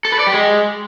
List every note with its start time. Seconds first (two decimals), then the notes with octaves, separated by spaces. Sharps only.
0.05 A4
0.12 B4
0.19 D5
0.27 G4
0.34 G#3